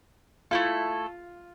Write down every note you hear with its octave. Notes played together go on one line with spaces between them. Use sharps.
A3 E4 F4 A4